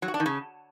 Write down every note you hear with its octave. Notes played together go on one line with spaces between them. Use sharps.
F#3
F#4
D4
D#3
C#3